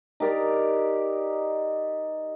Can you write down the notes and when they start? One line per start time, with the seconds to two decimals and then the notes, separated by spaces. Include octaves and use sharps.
0.20 D#4 G4 A#4 D5